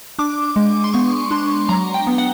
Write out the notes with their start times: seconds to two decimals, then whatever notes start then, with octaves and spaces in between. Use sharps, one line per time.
0.19 D4 D6
0.56 G#3
0.84 C6
0.93 B3 C#6
1.31 D4 C6
1.69 F#3 A#5
1.94 G5
2.07 B3
2.18 F#5